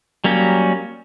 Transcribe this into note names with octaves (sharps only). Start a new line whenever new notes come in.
F#3 G3 A#3 C#4